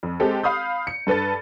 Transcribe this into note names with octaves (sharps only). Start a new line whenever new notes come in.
F2
G#3 C4 G4 A4
F5 B5 D#6 G6
C#7
G2 A4 B4 A5 A6